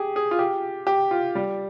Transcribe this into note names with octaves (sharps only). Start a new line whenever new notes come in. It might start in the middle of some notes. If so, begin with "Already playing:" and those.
Already playing: G4 G#4
G#4
F4
G4
G4
F4
G3